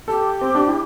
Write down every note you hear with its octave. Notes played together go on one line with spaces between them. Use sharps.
G4 A4
C4
D4
E4